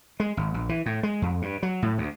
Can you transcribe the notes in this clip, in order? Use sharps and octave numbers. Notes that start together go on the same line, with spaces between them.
G#3
G#1
A#1
E3
A2
G#3
F2
G2
F#3
A2
D2